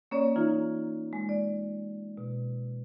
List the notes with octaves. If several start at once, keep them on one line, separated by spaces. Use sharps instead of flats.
A#3 C#4 C#5 D5
E3 D#4 F4 A#5
G#3
D5
B2